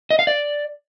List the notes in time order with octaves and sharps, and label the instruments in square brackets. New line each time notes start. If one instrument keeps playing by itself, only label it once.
[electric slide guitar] D#5
F5
D5